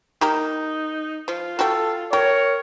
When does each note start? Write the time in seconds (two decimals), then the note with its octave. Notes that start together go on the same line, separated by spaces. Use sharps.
0.21 A#3 D#4 G4 A#4
1.28 F3 F4
1.59 F#4 G4 A4
2.13 G4 A#4 C#5